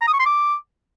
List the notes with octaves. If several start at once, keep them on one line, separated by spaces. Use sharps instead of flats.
A#5
D#6
C#6
C6
D6